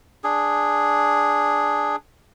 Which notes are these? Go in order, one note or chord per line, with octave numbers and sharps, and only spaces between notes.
D4 G#4